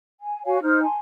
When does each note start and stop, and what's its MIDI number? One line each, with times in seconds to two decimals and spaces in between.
0.20 0.42 80
0.45 0.58 66
0.45 0.58 73
0.45 0.58 77
0.45 0.58 80
0.62 0.83 63
0.62 0.83 72
0.62 0.83 89
0.83 0.99 80
0.83 0.99 81
0.83 0.99 84